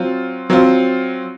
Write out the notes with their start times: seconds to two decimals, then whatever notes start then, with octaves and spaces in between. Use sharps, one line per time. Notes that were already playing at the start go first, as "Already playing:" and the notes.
Already playing: F#3 C4 F4
0.50 F#3 C4 F4